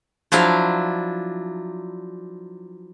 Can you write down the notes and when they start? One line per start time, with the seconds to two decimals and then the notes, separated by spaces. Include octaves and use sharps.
0.32 F3 F#3 D4 E4 F5